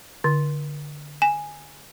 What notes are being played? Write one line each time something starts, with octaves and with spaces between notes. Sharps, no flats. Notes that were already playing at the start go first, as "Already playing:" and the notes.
D3
G#5